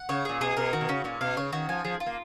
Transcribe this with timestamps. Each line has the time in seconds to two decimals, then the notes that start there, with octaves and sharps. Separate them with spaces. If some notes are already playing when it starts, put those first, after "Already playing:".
Already playing: F#5
0.09 C#3 C#5
0.25 A#2 G#4
0.41 B2 G#4
0.57 B2 A#4
0.73 D#3 F#4
0.81 B2
0.89 C#3 C#4
1.04 A#2 C#4
1.21 B2 F5
1.37 C#3 C#5
1.53 D#3 F#4
1.69 F3 G#5
1.85 F3 G#4
2.00 F4
2.06 A#3